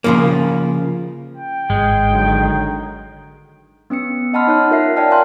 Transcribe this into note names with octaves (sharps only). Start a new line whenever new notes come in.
C#3 F3 A#3
G5
G#1 G#3
D3 D#3 F#3
B3 C#4 E6 C#7
D#5 F#5 A5 B5 C6 F6
D#4 C#5 F#6
F4 A#4 E5 C7
C#5 D5 G5 A5 F6
F5 G#5 A#5 C6 F#6